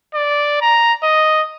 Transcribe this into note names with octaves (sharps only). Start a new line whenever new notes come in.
D5
A#5
D#5